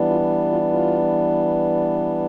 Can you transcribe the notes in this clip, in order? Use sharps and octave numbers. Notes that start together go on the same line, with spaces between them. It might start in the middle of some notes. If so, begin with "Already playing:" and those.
Already playing: E3 G3 B3 D4
F4
F4
F4